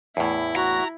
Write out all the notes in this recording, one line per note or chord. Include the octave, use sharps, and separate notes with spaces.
E2 A2 E4
F#4 A#5